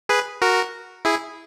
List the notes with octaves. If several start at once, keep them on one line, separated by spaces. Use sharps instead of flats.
G#4 B4
F#4 A#4
E4 G#4